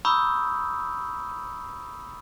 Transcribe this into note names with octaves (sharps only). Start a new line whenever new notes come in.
A#5 B5 C#6 D#6 E6 G6